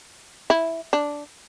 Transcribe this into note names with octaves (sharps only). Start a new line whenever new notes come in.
E4
D4